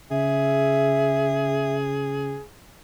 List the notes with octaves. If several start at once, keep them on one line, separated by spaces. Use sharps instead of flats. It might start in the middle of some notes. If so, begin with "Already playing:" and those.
C#3 G#4 E5